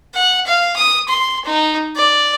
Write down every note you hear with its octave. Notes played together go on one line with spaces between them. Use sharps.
F#5
F5
D#6
C6
D#4
D5